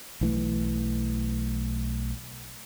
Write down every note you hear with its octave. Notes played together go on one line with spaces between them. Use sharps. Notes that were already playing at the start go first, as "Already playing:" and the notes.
B1 E3 A3